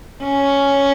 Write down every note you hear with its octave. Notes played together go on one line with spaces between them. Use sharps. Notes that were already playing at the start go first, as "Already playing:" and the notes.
C#4